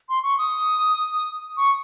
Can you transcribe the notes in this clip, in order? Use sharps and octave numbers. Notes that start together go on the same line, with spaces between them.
C6
C#6
D#6
C#6